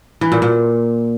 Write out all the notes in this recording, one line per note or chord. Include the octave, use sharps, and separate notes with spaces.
E3
A#2
A#2